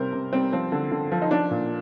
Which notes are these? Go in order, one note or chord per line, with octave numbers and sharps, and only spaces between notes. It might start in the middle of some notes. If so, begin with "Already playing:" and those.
Already playing: C3 G3 A#4 C5
C3
G3 C4
F3 C4
D3
D3
F3
D#4
F3 D4
A#2